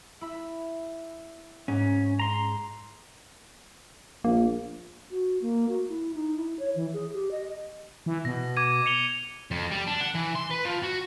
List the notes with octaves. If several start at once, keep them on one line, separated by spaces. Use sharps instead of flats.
E4 B5
G#2 C#4
A#5 C6
A#1 A#3
F#4
A#3
F#4
E4
D#4
E4
C#5
E3
G#4
G4
D#5
E3
B2 A#6
D6 G#6 D#7
C#7 F7 G7
F2
G3
D4
F#5
E3
C6
B4
F3
F#4